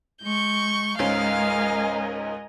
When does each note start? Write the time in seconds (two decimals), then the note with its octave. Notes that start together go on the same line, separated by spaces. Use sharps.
0.23 G#3 C#6 G6
0.99 C#2 G#2 G#3 C#4 A#4 D#5 F5 G#5